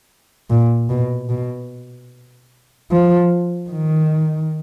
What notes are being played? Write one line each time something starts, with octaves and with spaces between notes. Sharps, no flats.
A#2
B2
B2
F3
D#3